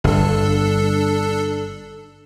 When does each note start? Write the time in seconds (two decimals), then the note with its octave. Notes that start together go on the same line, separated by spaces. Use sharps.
0.04 G1 D4 A4